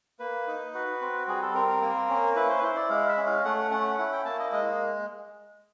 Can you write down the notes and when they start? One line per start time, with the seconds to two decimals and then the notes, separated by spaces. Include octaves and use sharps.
0.19 A#3 B4
0.47 D#4
0.74 F#4 B4
1.01 C4
1.28 G3 G#4
1.42 A4
1.55 C4 A#4
1.69 A#4
1.82 A#3
2.09 C#4
2.36 E4 B4
2.49 C5
2.59 B4
2.64 E4 C5
2.76 D5
2.90 G#3 F5
3.09 E5
3.17 C#4
3.26 F5
3.45 A3 F#5
3.71 C#4 F#5
3.99 E4 F#5
4.12 G5
4.25 A#3 A5
4.39 D#5
4.52 G#3 D#5